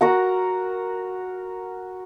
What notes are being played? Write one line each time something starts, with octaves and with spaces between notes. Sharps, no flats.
F#4 A#4 F#5